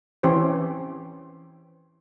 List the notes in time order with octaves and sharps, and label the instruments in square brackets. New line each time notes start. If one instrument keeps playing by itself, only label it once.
[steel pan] E3 C4 C#4 G4 C5